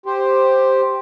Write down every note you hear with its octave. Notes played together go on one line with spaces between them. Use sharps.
G4 C5